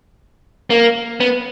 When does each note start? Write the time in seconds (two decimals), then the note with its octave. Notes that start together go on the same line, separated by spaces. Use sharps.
0.70 A#3
1.20 B3